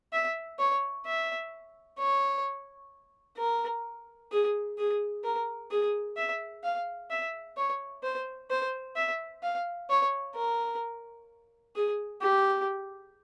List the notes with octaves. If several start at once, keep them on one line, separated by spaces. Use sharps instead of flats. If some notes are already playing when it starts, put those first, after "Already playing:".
E5
C#5
E5
C#5
A#4
G#4
G#4
A#4
G#4
E5
F5
E5
C#5
C5
C5
E5
F5
C#5
A#4
G#4
G4